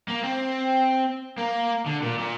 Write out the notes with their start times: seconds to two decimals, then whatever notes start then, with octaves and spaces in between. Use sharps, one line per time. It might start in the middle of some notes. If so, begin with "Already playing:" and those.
0.08 A#3
0.24 C4
1.37 A#3
1.86 D3
2.02 A#2
2.18 A#2